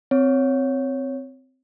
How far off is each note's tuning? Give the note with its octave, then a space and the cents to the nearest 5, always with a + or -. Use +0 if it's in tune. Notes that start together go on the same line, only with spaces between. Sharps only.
C4 -10 C#5 +0